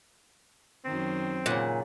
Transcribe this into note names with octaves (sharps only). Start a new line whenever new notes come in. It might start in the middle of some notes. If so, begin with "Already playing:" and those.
F#2 D#3 C4
A#2 C#3 F#5